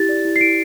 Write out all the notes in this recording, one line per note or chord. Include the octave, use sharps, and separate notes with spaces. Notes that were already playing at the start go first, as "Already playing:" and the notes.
Already playing: E4 G4 A6
D5
E4
C7
E4 D7